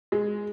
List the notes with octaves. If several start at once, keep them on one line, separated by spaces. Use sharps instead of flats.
G#3